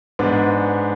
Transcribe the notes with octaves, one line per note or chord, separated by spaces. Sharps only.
G#2 G#3 B3 D4